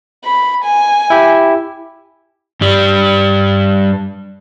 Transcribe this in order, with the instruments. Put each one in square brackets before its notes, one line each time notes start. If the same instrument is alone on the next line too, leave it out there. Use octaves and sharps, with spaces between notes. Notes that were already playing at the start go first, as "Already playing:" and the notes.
[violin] B5
G#5
[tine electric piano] E4 G4
[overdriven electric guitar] G2 G3